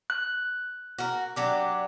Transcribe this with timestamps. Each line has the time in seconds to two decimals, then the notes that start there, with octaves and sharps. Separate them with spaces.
0.10 F#6
0.98 F#4 A#4
1.36 F#3 D4 G4